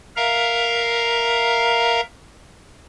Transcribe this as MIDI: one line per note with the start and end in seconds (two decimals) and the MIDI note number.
0.16 2.01 70
0.16 2.01 76
0.16 2.01 77
0.16 2.01 82